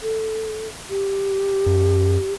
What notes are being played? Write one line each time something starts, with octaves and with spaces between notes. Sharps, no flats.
A4
G4
F#2